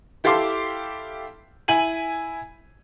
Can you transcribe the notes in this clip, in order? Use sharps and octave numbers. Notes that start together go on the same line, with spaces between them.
E4 G4 A4 F5 C6 D6
E4 G#5 D#7 F#7